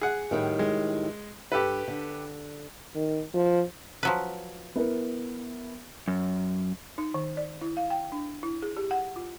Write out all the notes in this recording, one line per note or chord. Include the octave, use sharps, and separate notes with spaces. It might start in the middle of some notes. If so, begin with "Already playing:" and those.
G#4 F#5
A2 D#3 G3
G#3
G2 G4 A4 B4
D3
D#3
F3
F3 F#3 B4
B3 E4 A#4
F#2
D#4
D#3
D5
E4
F5
G5
D4
E4
G#4
G4
F#5
F4